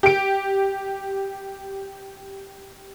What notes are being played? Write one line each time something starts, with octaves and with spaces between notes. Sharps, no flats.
G4 D7